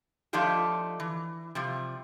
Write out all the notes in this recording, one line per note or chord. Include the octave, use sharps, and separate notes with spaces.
F3 A3 D4 D#4 F4 G4
E3
C3 F3 G3